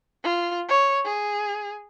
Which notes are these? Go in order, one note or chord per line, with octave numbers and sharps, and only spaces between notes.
F4
C#5
G#4